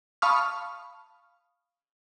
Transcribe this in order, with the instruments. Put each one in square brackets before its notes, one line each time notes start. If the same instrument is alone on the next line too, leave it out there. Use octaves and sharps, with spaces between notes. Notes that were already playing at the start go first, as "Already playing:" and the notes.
[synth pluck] F5 A5 B5 C#6 D#6 F6